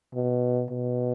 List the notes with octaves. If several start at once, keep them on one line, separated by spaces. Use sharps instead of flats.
B2
B2